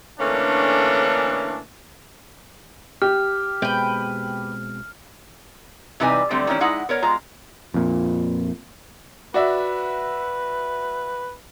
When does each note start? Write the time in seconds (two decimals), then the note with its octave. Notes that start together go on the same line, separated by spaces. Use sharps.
0.19 D3 E3 A3 A#3 C#4 D4
3.02 G4 F6
3.62 B2 G#3 C4 B4 G5
6.00 C3 E3 G3 D#4 B4 G#5
6.30 D3 F#3 G3 A3 C4
6.47 D#3 E3 A3 C#4 D4
6.60 G#3 D#4 E4 F#5
6.89 B3 A#4 C#5
7.02 G#3 F4 A#5
7.74 F2 A#2
9.34 F#4 B4 D5 E5